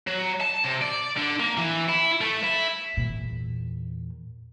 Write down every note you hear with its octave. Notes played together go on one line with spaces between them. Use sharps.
F#3
A5
C3
D5
D3
A#3
E3
E4
A3
E4
E2 A#2